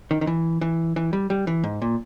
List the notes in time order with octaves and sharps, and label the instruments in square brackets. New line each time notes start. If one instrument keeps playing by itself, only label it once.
[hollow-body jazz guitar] D#3
D#3
E3
E3
E3
G3
G3
E3
G#2
A#2